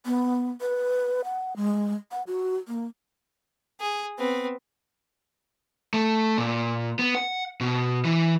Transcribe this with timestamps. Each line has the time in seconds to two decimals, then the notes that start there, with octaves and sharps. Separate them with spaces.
0.06 B3
0.61 B4
1.24 F#5
1.56 G#3
2.12 F#5
2.27 F#4
2.68 A#3
3.80 G#4
4.18 B3 C4
5.94 A3
6.38 A#2
6.99 B3
7.15 F#5
7.61 B2
8.05 E3